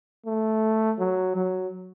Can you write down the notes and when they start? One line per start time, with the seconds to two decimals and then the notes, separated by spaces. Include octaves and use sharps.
0.26 A3
0.99 F#3
1.35 F#3